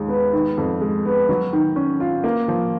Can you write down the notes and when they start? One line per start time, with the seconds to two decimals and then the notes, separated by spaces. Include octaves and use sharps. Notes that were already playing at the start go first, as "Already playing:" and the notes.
Already playing: D#2 G#3
0.08 B3
0.33 D#3
0.57 F2
0.81 G#3
1.05 B3
1.29 F#3
1.53 D#3
1.76 C#4
2.00 F4
2.24 A#3
2.48 F3